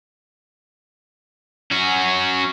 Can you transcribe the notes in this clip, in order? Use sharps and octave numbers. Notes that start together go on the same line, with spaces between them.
C#4 F#4